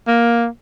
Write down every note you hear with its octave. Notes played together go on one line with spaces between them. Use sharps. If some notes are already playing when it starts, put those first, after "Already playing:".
A#3